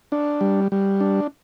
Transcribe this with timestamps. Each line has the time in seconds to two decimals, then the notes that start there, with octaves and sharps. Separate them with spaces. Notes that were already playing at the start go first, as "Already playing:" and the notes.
0.12 D4
0.41 G3
0.72 G3
1.00 D4